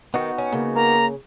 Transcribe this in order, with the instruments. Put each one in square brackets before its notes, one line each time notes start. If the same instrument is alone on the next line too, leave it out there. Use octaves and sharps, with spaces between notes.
[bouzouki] D#3 [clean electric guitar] B3 D#4 F#4
[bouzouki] C#4
[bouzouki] C#3 [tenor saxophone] A#3
[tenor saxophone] A#3 [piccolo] A#5